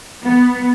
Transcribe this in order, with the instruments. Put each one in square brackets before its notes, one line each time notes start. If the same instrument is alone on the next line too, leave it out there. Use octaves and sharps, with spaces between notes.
[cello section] B3